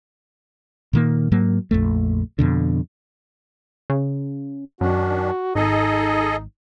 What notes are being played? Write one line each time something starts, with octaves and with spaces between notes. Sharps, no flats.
A#2 D#3 A#3
G#2 F#3 A#3
A#1 F2 A3
F2 B2 D3
C#3
F#2 D#3 C#4 D4 F#4
G#1 D#4 G#4 A4 D#5